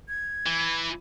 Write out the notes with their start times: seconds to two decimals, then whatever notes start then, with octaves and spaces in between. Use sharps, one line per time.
0.08 G#6
0.46 E3